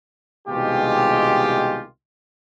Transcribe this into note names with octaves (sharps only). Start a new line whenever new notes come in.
C2 B2 D#3 G#3 F4 G4